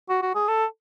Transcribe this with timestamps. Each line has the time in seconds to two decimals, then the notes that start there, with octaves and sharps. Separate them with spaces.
0.09 F#4
0.22 F#4
0.35 G#4
0.48 A4